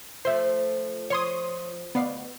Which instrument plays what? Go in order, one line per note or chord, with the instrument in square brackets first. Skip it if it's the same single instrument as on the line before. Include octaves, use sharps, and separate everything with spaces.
[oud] F3 A3 [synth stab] C5 E5
[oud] F3 [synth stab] C#5 C6 D#6
[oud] D2 D5 F5 [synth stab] B3